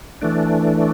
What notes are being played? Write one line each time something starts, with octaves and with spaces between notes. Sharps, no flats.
E3 A3 D4